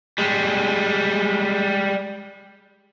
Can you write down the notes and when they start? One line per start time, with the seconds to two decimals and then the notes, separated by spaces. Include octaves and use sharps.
0.18 G3 G#3